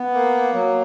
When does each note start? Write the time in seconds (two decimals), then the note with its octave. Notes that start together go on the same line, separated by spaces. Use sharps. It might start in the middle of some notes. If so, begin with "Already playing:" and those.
Already playing: B3
0.14 A#3
0.53 F#3